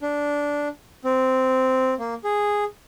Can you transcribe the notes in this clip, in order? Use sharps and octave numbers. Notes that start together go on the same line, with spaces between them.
D4
C4
A#3
G#4